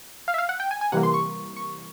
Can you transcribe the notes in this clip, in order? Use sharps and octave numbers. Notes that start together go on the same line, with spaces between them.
F5
E5
F5
F#5
G5
G#5
G#5
C3 E3 G3 A#3 F#5
C6
C#6
C#6